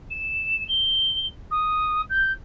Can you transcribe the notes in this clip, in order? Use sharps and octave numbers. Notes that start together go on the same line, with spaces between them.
E7
G7
D#6
G6